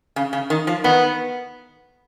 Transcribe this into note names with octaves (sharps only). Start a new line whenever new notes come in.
C#3
C#3
D#3
F3
D#3 B3